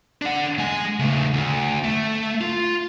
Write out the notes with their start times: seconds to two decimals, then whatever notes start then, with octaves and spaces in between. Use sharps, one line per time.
0.22 D4 F#5
0.58 G#3 G#5
0.99 C#3 A3
1.34 D2
1.84 A3
2.41 F4